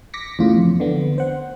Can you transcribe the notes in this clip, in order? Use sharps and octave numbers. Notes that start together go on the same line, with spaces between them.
D6 A#6 B6 C#7
E2 A2 C#3 F4
F2
D3 B3
C5 F#5